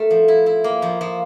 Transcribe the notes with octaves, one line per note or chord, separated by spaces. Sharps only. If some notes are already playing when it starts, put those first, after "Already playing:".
Already playing: A3 A#4
F3
E4
E4
A#3
F3
F3